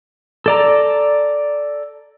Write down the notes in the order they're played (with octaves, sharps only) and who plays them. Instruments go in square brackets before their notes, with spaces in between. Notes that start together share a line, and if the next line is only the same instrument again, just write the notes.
[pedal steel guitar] A4 D5 A#5